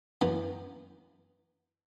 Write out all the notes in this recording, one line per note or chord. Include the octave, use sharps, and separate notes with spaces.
F#2 E3 B3